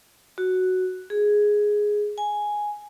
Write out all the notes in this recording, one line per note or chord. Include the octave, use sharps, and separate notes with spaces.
F#4
G#4
G#5